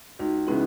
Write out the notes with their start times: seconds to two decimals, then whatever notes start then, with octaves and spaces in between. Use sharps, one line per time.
0.19 C#2 D#4 F#4
0.47 C#3 E3 G#3 B3 C#4 E4